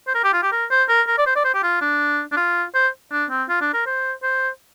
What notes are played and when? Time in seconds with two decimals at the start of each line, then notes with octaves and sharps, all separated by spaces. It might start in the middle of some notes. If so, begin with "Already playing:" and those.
0.07 C5
0.15 A#4
0.24 G4
0.33 F4
0.43 G4
0.52 A#4
0.71 C5
0.89 A#4
1.08 A#4
1.18 D5
1.26 C5
1.36 D5
1.45 C5
1.54 G4
1.63 F4
1.82 D4
2.32 D4
2.37 F4
2.75 C5
3.12 D4
3.31 C4
3.49 F4
3.61 D4
3.74 A#4
3.87 C5
4.23 C5